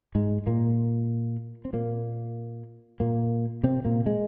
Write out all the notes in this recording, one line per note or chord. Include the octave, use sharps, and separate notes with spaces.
G#2 G#3
A#2 A#3
C4
A#2 A#3
A#2 A#3
C3 C4
A#2 A#3
G#3